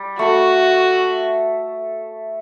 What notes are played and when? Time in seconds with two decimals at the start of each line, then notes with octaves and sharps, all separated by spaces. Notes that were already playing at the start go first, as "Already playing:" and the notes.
Already playing: G3
0.19 A3 F#4